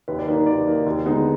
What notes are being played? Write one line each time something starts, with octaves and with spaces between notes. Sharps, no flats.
D#2 B4
D5
D#3 A#3 D#4 B4
D#2 D5
D#3 A#3 D#4
D#2
D3 G#3 B3 D#4